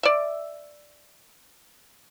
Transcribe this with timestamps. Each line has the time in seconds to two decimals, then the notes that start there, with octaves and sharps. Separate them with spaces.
0.03 D5 E5